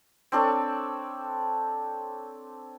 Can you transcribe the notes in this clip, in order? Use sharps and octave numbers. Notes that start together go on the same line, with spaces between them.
C4 D4 A4 C#5